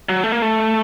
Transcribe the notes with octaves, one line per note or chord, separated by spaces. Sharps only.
F#3
A3
A#3
A3